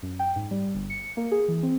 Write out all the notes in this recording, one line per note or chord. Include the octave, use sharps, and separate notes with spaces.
F#2
G5
G#2
G3
G1
C#7
A#3
G#4
E3
C4